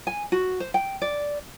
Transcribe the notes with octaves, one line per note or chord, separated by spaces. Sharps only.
G#5
F#4
C5
G5
D5